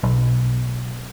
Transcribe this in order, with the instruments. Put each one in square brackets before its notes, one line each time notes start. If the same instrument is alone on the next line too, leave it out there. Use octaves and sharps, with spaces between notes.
[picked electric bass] B1